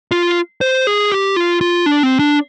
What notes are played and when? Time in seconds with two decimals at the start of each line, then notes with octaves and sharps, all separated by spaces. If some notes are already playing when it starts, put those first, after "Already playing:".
0.12 F4
0.61 C5
0.87 G#4
1.12 G4
1.36 F4
1.61 F4
1.86 D4
2.03 C4
2.19 D4